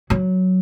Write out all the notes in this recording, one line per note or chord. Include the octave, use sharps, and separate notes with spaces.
F#3